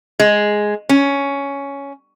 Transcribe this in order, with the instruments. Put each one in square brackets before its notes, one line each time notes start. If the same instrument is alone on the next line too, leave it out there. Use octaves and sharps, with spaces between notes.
[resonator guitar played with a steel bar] G#3
C#4